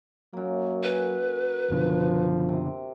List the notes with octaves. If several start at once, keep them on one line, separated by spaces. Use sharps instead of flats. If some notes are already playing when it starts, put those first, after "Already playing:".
F#2 F#3 A#3
B4 F#5 G#5
F#1 B2 D3 F3
C3